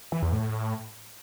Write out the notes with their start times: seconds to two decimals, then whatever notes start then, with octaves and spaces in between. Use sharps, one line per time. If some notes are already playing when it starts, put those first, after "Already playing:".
0.12 E3
0.22 E2
0.33 A2